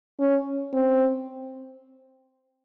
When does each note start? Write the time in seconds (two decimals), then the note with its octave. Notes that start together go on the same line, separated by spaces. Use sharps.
0.20 C#4
0.74 C4